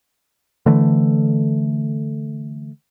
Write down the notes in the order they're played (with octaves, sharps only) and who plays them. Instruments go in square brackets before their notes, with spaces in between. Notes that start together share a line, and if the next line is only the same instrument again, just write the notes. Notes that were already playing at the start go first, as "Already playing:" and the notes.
[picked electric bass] D3 E3 A3